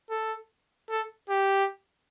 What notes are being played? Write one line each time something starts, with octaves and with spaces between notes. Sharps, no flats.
A4
A4
G4